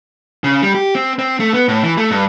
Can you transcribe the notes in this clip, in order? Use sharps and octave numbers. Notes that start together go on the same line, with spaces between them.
C#3
G3
G4
C4
C4
A3
B3
A2
E3
A3
G2